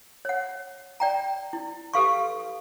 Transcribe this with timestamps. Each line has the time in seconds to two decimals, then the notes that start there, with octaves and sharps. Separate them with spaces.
0.25 C#5 F#5
1.00 D5 G5 A#5
1.53 E4
1.94 G4 A4 B4 F5 C6 C#6